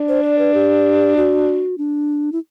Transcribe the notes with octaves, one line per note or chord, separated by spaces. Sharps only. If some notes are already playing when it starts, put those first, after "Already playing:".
Already playing: D4
C5
D5
B4
G4
F#4
D4
E4